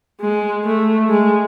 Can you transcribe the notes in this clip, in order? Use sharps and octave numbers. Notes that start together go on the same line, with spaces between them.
G#3
A3
G#3